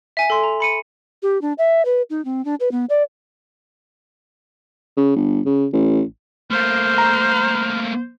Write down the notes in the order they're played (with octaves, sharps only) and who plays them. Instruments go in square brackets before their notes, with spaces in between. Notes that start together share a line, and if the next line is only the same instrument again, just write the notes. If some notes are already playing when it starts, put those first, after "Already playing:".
[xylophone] E5 G#5
A4 C6
A#5
B5 C#7 D#7
[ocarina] G4
D4
E5
B4
D#4
C4
D4
B4
B3
D5
[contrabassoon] C#3
G1
C#3
A1
[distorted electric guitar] A3 A#3 [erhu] C5 [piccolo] F6
[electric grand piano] A#5